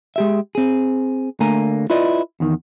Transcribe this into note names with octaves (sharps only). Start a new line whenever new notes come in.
G#3 G4 E5
C4 G#4
D3 A3 A#3 G#5 A#5
E4 F4 B4 D5 D#5
E2 D#3